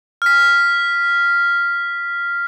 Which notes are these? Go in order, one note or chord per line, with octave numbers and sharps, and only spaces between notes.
F6 B6